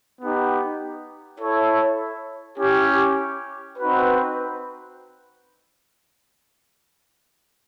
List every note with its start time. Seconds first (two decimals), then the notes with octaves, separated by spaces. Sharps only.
0.19 B3 D#4 G4
1.39 E4 A4 C#5
2.58 C#4 E4 G4
3.78 C4 D#4 F#4 B4